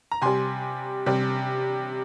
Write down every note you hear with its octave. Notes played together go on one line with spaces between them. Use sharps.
A#5
C3 G3 G#5 C6
C3 G3